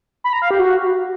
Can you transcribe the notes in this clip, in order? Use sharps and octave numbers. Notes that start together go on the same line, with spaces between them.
B5
A#5
F5
G4
F#4